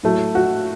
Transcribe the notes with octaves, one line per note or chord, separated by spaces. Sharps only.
A2 F#3 A3
F#4